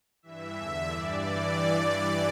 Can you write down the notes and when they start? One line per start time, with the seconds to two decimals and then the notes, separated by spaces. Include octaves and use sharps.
0.23 G2 E3 E5
0.55 E2 D3
0.86 G2 E3 D5